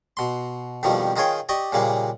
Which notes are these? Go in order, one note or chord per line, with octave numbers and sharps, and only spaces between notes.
B2 C6
F2 B2 D#3 F3 G3
D#3 D#4 F4 G#4 C#5 G5
G4 D5 D#5 C#6
A#2 C#3 G3 G#3 A#3